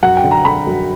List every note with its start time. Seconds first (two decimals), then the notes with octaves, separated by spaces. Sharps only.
0.03 F#2 F#5
0.17 G5
0.24 D3
0.31 A#5
0.45 D3 B5
0.67 F#2